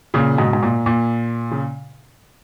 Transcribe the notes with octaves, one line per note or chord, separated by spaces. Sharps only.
A#2 C#3
G#2 B2
G#2
A#2
A#2
C#3